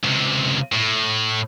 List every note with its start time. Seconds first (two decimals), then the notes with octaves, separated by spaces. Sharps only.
0.04 C#2 C3
0.72 A2